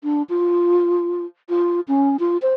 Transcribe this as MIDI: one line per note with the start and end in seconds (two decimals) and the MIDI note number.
0.04 0.22 62
0.30 1.25 65
1.49 1.80 65
1.88 2.17 61
2.19 2.37 65
2.42 2.54 72